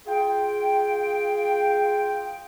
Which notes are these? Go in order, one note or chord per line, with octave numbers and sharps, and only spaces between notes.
F4 G#4 G5